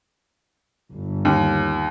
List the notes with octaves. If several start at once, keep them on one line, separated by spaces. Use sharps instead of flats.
G1
D#2